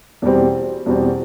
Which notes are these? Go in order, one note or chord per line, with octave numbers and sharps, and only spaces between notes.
E2 B2 G3 C4
E2 B2 G3 C4